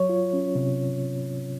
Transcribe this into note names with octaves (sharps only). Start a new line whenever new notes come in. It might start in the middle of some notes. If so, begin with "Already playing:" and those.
Already playing: F#3 C#5
F4
C#4
C3